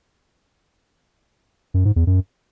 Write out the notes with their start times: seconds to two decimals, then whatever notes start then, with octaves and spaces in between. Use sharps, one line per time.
1.74 F#2
1.85 G#2
1.96 E2
2.07 F#2